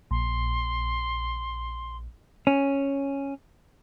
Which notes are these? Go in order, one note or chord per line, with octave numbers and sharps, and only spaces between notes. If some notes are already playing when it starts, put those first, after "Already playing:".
A#1 C6
C#4